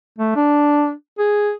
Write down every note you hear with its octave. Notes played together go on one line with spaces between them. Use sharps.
A3
D4
G#4